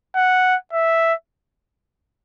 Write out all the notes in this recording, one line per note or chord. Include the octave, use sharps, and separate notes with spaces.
F#5
E5